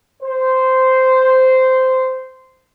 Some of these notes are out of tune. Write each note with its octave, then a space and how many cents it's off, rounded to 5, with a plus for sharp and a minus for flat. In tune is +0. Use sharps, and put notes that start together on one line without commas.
C5 -10